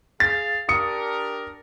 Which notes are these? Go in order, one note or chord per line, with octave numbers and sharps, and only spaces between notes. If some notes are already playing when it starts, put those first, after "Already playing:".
G#4 F5 A6
D4 G4 A#4 D#6 C#7